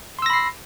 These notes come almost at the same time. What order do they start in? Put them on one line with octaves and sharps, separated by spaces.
C6 E6 A#6 B5 C7